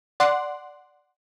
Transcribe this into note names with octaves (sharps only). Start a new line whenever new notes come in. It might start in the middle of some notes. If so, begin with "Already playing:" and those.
D5 F#5 C6